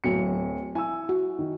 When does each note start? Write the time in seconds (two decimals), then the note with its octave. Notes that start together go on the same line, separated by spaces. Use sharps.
0.04 D1 F#3 C#7
0.75 E4 G#5 E6
1.09 F#4
1.39 D#3